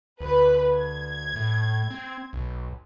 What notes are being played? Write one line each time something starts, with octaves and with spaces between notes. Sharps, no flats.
D2 B4
G#6
A2
C4
B1